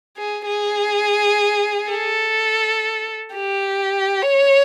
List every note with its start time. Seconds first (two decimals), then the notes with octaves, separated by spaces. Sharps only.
0.17 G#4
0.46 G#4
1.90 A4
3.35 G4
4.22 C#5